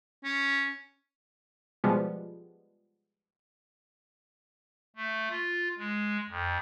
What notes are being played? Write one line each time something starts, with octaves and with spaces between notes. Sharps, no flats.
C#4
B2 F3 G3 G#3 B3
A3
F4
G#3
F2